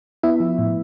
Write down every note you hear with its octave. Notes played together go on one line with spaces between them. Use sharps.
B3 E4 E5
F3
A2